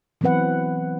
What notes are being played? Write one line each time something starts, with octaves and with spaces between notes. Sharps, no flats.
E3 F#3 B3 C4 B4 F#5